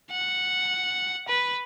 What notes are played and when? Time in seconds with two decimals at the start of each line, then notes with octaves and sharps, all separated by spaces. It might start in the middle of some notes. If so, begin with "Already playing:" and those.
0.12 F#5
1.28 B4